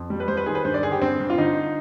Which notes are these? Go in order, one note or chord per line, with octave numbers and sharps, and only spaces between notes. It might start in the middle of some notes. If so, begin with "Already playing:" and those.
Already playing: F2
G3
B4
G3 C5
B4
D#3 G#4
B4
G2 C5
D5
D3 G#4
G4
G2 C4
G2
F4
D3 D#4